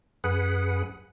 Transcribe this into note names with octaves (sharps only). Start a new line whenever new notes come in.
F#2 G#4 B4 F#5